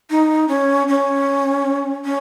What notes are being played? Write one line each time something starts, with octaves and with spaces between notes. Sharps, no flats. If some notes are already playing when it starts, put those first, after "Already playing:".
D#4
C#4
C#4
C#4